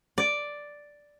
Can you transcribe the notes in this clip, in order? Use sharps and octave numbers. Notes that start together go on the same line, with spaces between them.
D5